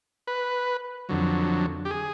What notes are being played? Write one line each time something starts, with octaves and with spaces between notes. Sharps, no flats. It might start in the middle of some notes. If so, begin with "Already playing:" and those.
B4
F2 D3 F#3
G4
G#4